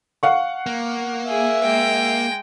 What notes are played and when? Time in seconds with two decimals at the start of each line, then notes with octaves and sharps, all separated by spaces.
0.23 F5 F#5 C#6
0.66 A#3
1.28 G#4 E5
1.62 G#3 G5